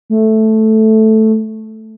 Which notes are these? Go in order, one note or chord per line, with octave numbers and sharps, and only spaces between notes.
A3